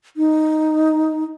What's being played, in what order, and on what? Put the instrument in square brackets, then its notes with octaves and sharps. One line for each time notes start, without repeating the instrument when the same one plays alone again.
[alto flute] D#4